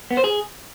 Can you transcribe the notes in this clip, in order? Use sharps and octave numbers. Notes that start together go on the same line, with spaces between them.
B3
C5
G#4